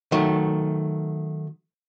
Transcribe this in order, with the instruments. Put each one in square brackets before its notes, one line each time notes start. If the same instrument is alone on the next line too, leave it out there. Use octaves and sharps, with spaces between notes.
[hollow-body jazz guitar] D#3 F#3 A3